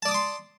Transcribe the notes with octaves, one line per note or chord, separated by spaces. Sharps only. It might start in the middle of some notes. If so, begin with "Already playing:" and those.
D5 A5 C6 D6 D#6